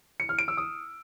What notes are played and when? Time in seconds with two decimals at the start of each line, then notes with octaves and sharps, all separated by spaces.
0.20 C#7
0.29 F6
0.39 D7
0.48 E6
0.57 D#6